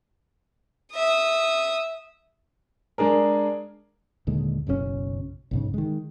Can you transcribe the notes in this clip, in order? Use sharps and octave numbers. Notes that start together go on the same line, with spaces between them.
E5 D#6
G#3 D4 G#4 A#4
D#2 A#2 D3 G#3
F#1 B1 A#2 C#4
B1 G#2 C#3
D#3 G#3